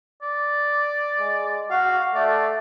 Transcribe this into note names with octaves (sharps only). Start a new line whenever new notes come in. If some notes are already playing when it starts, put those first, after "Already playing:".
D5
G#3
F#4 F5
A3 D5